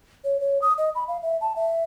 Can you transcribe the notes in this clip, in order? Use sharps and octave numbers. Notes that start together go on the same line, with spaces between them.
C#5
C#5
D#6
D#5
B5
F5
E5
A5
E5